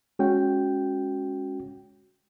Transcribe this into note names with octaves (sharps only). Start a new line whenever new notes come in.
G#3 C#4 F#4 G5